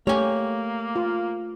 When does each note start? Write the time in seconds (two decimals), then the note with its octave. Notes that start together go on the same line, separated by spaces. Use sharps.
0.07 A3 A#3 G4 C#5 G#5
0.96 F4